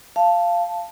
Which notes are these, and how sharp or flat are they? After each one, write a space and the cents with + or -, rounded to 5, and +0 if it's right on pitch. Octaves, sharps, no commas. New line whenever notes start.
F5 -10 A5 +0